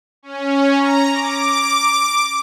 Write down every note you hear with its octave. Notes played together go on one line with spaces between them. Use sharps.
C#4
A#5
D6